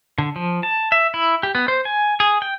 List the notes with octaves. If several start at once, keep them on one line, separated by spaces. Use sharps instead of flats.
D3
F3
A5
E5
E4
G4
B3
C5
G#5
G#4
G5